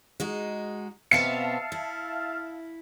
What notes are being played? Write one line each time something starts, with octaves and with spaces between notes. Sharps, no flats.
G#3 D#4 F#4
B2 B3 C4 E5 F5 A5 C#7
E4